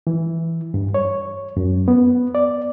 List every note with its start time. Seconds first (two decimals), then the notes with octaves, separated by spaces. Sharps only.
0.07 E3
0.74 G2
0.94 C#5
1.57 F#2
1.88 B3
2.35 D5